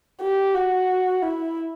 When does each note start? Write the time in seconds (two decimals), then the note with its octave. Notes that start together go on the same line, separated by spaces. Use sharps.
0.22 G4
0.55 F#4
1.22 E4